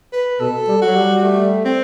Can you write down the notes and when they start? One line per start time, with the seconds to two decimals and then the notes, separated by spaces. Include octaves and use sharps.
0.12 B4
0.40 B2 A4
0.68 G3
0.82 F#3 F#4
0.96 G3
1.23 A3
1.65 C4